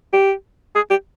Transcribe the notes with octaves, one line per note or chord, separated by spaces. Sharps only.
G4
G#4
G4